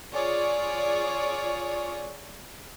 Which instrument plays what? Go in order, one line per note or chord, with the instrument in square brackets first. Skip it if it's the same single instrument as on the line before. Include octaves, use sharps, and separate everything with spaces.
[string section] F4 G#4 C#5 D5